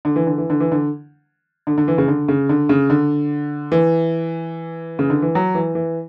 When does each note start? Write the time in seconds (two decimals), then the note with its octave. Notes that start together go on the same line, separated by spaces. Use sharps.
0.05 D3
0.16 E3
0.27 D3
0.38 E3
0.50 D3
0.60 E3
0.72 D3
1.67 D3
1.78 D3
1.88 E3
1.98 C#3
2.08 D3
2.28 C#3
2.49 D3
2.69 C#3
2.90 D3
3.72 E3
4.99 C#3
5.10 D3
5.22 E3
5.35 F#3
5.55 E3
5.75 E3